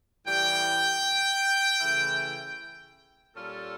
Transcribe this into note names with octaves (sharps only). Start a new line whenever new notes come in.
A2 E3 G3 G5
C#3 E3 A3 E4
A#2 G3 C#4 F4 A4